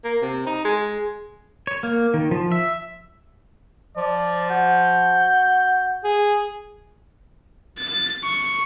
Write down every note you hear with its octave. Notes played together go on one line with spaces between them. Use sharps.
A#3
C3
D#4
G#3
C#5
A#3
D#3
F3
E5
F3 D5
F#4 G6
G#4
A6
C#6